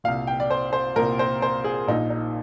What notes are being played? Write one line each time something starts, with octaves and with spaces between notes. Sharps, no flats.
C2 A#2 F5
G5
D5
C5
C5
C2 A#2 A#4
C5
C5
G#4
A#1 A#2 D#4
D#4